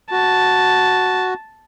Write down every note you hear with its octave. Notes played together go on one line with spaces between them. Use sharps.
F#4 A5